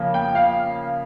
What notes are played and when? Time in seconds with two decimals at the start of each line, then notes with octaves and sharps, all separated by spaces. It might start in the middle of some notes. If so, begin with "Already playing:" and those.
Already playing: C#3 F3 A#3
0.14 G5
0.35 F5